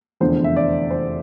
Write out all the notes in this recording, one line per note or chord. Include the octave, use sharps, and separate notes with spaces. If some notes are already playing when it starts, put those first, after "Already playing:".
F1 E2 D3 F3 C5
E5
D5
C5